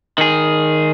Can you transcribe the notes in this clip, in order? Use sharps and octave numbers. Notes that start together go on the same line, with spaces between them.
D#3 G#4